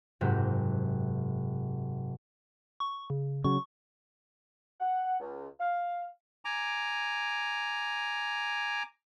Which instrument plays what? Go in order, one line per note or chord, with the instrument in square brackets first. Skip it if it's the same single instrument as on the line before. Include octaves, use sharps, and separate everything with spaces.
[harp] F#1 G#2 C3 F#4 G4
[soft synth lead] C#6
C#3
[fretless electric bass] C#3 F#3 [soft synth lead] C#6
[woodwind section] F#5
C#2
F5
[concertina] G#5 A#5 D6